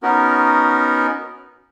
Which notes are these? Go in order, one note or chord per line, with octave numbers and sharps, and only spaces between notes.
B3 C#4 D#4 F#4 A#4